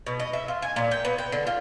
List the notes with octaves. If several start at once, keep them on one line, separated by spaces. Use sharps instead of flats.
B2
D#5
E5
F4
G#5
A#2
G5
B3
G5
D3
F4